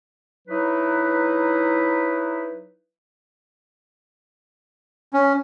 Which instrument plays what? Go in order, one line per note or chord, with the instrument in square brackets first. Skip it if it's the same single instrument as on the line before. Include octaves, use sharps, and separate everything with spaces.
[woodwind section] F#3 D#4 E4 B4
[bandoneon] C#4